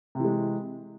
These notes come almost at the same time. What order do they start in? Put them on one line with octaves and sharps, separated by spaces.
C3 E3 G#3